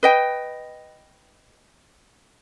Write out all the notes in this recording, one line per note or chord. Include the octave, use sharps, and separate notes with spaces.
B4 D#5 G5